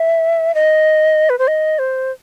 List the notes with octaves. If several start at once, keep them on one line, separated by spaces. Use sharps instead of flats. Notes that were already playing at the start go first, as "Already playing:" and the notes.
Already playing: E5
D#5
B4
C5
D#5
C5